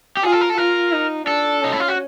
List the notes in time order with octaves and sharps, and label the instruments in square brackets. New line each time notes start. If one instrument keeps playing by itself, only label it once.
[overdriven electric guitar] G4
[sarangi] F4 [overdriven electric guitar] G#4
[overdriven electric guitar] A4
A#4
A4
[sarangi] F4 [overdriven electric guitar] A#4
[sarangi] D#4
[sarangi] D4 [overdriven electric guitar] A4
[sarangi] C#4 [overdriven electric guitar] D#4
[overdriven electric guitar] E4
F4
F#4